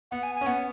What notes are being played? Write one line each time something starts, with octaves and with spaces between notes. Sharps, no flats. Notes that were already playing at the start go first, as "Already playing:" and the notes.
B3 F#5
G#5
G#5
C#4
B3 F#5